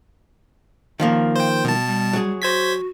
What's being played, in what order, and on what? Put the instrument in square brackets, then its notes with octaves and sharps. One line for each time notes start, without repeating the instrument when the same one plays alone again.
[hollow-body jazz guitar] D#3 F3 A#3 [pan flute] F5
[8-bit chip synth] C5 G5
[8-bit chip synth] B2 A5 [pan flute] G3
[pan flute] G3
[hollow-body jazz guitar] F#3 G#4
[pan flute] F#4 [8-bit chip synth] C5 G#6 B6